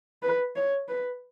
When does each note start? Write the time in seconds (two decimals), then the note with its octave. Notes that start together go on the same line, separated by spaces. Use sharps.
0.23 B4
0.56 C#5
0.89 B4